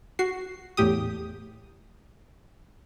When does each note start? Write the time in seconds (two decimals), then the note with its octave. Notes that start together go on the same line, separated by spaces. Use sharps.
0.19 F#4 C7
0.77 E2 A2 G4 D#6